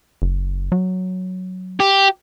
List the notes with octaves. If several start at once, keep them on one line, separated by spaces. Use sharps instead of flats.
F#1
F#3
G4